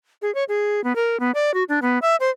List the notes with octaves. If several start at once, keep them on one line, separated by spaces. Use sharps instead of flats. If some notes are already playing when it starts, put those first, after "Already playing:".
G#4
C#5
G#4
B3
A#4
B3
D5
F#4
D4
B3
E5
C5